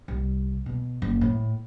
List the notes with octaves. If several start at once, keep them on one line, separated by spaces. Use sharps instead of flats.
C2
B2
F#1
A2